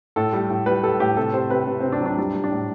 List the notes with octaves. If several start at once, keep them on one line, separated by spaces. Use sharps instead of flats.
A2 A4
G3
A2
G3 B4
G3 A4
A2 G4
C3 A4
C3 C5
C3 B4
C3
C3 C4
D4
F#3
D4
G3 D4
G3
D4
A2